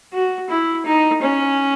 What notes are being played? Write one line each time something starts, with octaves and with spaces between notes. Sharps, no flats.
F#4
E4
D#4
C#4